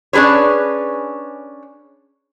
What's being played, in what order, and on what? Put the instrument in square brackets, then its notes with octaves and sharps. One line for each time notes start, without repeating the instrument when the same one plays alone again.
[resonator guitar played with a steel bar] C#4 D4 G#4 B4 C#5